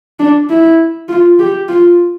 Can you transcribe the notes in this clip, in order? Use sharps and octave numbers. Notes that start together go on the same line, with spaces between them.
D4
E4
F4
G4
F4